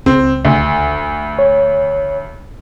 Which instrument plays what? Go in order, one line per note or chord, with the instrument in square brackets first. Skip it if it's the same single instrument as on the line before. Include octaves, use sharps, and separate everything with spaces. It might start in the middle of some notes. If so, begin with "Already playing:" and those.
[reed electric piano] C#2 [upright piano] C4
[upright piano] D2
[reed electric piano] C#5